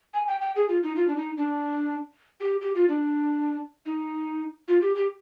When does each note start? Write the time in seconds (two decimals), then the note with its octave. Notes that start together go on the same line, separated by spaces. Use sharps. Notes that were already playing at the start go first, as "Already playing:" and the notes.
0.14 G#5
0.27 G5
0.41 G5
0.56 G#4
0.69 F4
0.83 D#4
0.96 F4
1.08 D4
1.16 D#4
1.37 D4
2.40 G4
2.61 G4
2.75 F4
2.89 D4
3.86 D#4
4.68 F4
4.81 G4
4.95 G4